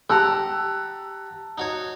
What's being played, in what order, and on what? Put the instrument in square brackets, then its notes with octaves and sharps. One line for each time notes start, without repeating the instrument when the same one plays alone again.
[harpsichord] G4 F#5 A#5 [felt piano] A5 E6 F#6
[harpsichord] D#4 F#4 C#5